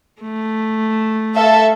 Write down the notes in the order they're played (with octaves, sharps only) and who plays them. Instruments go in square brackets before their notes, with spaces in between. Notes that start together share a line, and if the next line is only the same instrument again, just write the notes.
[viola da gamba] A3
[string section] A4 E5 F5